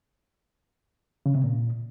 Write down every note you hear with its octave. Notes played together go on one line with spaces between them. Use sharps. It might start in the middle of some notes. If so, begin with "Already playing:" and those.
C#3
C3
A#2